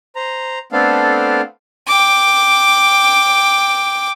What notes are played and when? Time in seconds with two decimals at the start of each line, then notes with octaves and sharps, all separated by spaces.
0.16 C5 A#5
0.72 A3 B3 C4 D4 A4 F5
1.87 G5 D6